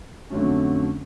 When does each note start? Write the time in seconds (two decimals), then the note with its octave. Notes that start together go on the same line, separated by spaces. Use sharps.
0.30 F2 D3 F#3 A3 C#4